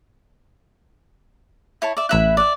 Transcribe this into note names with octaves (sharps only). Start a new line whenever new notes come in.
E4 C#5 A5
D5 E5
A1 E4 E5 B5 F#6
D5 E5